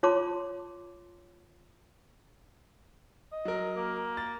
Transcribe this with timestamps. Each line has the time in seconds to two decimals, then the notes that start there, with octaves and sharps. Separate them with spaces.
0.03 F4 C#5 A5 C6 D6
3.32 D#5
3.45 F#3 A#4
3.76 A#3
4.17 A6